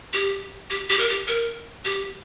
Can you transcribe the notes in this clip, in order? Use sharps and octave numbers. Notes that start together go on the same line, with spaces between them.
G4
G4
G4
A#4
G4
A#4
G4